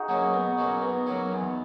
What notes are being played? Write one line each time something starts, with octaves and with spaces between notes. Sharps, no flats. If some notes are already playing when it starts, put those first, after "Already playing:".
Already playing: D#4 F#4 G#4
F#3 A#3 C#4
B2
F#3 A#3 C#4
B2
F#3 A#3 C#4
E2